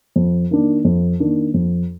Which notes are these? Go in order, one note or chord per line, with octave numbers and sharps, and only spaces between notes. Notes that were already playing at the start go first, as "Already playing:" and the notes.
F2
D#3 A#3 D4
F2
D#3 A#3 D4
F2